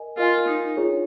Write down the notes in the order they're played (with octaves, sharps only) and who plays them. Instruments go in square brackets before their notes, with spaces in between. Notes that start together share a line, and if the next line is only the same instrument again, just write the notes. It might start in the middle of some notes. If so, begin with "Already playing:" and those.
Already playing: [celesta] A#4 D#5 G#5
[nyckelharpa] F4 [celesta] A#4 D#5 G#5
[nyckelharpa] D#4
[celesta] D4 F4 G#4 C#5